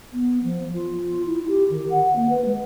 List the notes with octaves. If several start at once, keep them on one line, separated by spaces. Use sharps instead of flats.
B3
F3
F4
E4
G4
D#3
F#5
A#3
B4
G#3